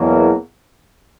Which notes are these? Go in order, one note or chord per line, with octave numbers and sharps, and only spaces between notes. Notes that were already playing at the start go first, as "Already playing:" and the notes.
Already playing: E2 B2 F#3 A#3